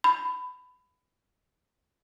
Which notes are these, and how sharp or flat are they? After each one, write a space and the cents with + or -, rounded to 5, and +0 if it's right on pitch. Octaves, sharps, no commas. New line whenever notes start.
B5 +20